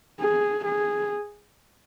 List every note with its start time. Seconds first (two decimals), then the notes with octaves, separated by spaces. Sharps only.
0.20 G#4
0.65 G#4